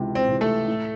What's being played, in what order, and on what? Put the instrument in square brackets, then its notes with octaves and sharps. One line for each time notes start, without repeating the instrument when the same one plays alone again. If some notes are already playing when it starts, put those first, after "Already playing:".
Already playing: [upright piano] C#2 C3 E3
[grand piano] C4
[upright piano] C3 E3
[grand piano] A3 A4
[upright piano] A2